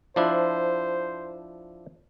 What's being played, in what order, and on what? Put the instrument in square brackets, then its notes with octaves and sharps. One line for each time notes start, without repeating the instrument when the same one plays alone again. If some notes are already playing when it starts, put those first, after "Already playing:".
[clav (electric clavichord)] F3 D4 E4 [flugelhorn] C5